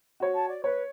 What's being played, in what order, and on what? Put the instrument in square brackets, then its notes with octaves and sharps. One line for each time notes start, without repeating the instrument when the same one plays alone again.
[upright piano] F#4 C#5
[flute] A5
D5
[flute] B4 [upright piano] C#5